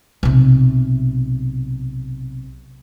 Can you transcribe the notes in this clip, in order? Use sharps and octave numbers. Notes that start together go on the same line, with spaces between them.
B1 C3